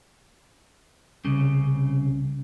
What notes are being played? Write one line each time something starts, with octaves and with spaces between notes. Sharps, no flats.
C2 C#3